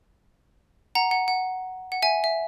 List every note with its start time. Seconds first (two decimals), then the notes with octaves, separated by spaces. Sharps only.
0.95 F#5 A#5
1.11 F#5
1.28 F#5
1.92 F#5
2.02 E5 G#5
2.24 E5